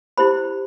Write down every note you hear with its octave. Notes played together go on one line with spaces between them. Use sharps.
E4 G4 C5 B5